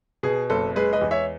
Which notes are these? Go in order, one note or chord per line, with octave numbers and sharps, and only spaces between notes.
B2 G#4
F#1 A4
G#3 G#4 B4
B4 D#5
E2
C#5 E5